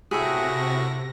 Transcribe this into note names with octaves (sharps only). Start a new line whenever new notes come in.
A2 C3 F#4 G#4 E5 A#6